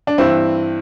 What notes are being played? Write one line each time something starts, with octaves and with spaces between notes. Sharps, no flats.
D4
G2 E3 C4 E4